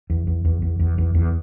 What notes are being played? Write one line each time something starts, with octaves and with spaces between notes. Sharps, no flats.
E2
E2
E2
E2
E2
E2
E2